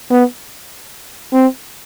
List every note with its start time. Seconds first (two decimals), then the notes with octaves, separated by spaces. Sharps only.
0.10 B3
1.33 C4